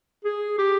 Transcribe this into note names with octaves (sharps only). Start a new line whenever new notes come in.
G#4
G4